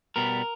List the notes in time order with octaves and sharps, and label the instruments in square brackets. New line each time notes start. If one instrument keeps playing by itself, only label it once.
[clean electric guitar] B2 G3 B3 A#4